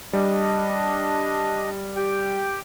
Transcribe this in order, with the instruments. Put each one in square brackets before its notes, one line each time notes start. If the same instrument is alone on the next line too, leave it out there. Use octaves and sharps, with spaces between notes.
[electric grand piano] G3 [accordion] D4 D#5
[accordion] G4 G5